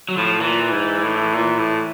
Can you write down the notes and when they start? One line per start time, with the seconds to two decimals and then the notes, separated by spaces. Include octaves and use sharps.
0.09 F#3
0.17 A2 F3
0.41 A#2 E3
0.72 G#2
1.04 A2
1.35 A#2
1.59 A2